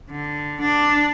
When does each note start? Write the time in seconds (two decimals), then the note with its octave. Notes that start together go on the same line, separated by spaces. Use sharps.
0.10 D3
0.61 D4